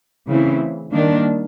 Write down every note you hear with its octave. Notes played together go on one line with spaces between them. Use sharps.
C#3 E3 A3 C4 E4
D#3 G3 A#3 D4